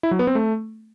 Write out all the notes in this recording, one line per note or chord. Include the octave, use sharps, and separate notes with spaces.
E4
F#3
B3
C4
A3